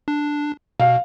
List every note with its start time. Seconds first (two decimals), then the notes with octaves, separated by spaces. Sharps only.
0.08 D4
0.80 B2 F5